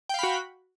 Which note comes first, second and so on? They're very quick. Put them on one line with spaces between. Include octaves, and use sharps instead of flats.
G5 F5 B5 F#4